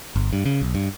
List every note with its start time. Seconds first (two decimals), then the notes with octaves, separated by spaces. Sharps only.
0.16 G1
0.33 G2
0.46 C#3
0.62 B1
0.75 G2